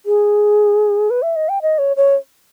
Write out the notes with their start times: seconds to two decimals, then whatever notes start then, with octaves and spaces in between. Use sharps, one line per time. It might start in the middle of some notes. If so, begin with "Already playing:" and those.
0.06 G#4
1.10 B4
1.22 E5
1.36 D#5
1.49 G5
1.62 D#5
1.78 C#5
1.97 C#5